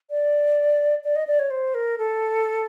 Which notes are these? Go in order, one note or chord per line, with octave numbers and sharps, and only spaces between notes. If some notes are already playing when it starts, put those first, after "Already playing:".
D5
D5
D#5
D5
C#5
C5
A#4
A4